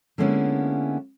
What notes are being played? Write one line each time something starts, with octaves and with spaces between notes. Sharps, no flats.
D3 G#3 A#3 B3 C#4 E4